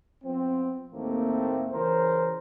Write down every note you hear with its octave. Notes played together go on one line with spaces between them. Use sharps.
F3 B3 C4
D#2 A2 A3 A#3 C4
C#3 E3 A#4 C5